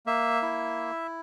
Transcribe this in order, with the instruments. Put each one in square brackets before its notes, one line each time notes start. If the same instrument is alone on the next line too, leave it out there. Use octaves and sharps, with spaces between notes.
[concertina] A#3 E5
E4